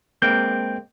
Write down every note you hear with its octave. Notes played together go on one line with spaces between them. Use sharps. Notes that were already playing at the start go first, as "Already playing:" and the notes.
G#3 A#3 C4 G6